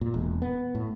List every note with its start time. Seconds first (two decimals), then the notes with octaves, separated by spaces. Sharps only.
0.01 A#2
0.14 E1
0.42 B3
0.75 A2